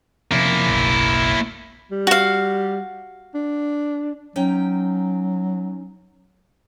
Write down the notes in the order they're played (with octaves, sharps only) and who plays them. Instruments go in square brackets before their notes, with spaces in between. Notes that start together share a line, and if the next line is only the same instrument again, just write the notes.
[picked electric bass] C3 F3 C#4 [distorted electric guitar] A#3 E4
[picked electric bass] F#1 B1
[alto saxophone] G3
[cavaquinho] F#4 F5
[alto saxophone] D4
[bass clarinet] F#3 [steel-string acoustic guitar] C#4 D#4 G5